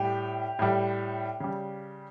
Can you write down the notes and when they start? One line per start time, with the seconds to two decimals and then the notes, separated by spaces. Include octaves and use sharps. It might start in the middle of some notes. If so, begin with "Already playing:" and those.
Already playing: A2 G3 G4
0.59 A2 G3
1.40 C#3 G3